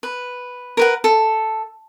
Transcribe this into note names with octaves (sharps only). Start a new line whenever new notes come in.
B4
A#4 B4 F#5
A4